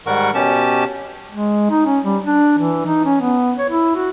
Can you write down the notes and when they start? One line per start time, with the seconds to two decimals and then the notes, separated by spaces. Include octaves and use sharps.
0.06 G#2 D#3 G3 A#4 F#5 C#6
0.34 B2 C#4 G4 A5
1.31 G#3
1.70 D#4
1.86 C#4
2.03 G3
2.26 D4
2.58 E3
2.86 D#4
3.05 C#4
3.20 B3
3.58 C#5
3.70 E4
3.95 F#4